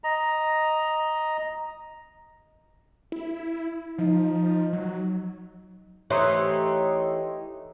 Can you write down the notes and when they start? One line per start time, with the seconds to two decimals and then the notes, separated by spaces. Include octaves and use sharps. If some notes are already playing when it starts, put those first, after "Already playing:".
0.04 D#5 A#5
3.12 E4
3.98 F3 D#4
4.73 F#3
6.10 E3 A3 D#4 G4 C#5 C6 D#6